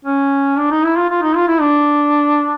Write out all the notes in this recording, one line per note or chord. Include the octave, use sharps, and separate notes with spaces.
C#4
D4
D#4
E4
F4
F4
D#4
F4
E4
D4